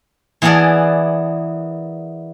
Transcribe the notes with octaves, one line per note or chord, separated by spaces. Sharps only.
E3 B3 E4 G#4 A#4 D5